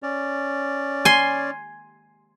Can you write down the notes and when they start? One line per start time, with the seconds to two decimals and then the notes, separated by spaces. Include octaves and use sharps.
0.03 C#4 D5
1.05 G#5 C6